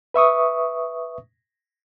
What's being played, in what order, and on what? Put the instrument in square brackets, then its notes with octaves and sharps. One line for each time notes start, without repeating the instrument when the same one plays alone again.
[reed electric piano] B4 E5 C#6 D#6